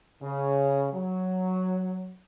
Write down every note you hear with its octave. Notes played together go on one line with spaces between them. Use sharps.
C#3
F#3